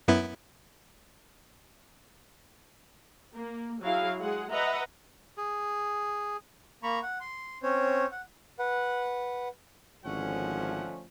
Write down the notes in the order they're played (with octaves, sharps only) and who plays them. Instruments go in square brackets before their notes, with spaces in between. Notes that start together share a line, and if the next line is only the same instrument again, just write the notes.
[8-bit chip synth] F#2 B3 E4
[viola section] A#3
F#3 E4 G#4 F5
G#3 G#4 F#5
B4 D#5 E5 F#5 A#5
[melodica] G#4
[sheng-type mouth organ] A#3 A#5 B5 C#6
F#5
C6
C4 C#4 C5 C#5
F#5
B4 F#5
[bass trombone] G#1 [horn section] D3 A3 C#4 [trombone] F3 [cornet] F#5